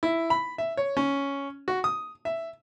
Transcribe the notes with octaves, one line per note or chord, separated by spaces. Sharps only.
E4
B5
E5
C#5
C#4
F#4
D#6
E5